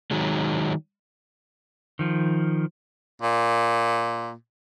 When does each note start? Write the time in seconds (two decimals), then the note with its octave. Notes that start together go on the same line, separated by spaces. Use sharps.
0.11 D#3 F#3 G#3
1.99 D#3 F3
3.22 A#2